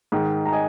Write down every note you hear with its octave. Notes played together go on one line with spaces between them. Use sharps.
G#2 D#3
A#5
D#5 G#5